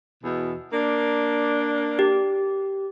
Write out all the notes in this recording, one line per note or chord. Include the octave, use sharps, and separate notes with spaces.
E2 B2
A#3 D4
G4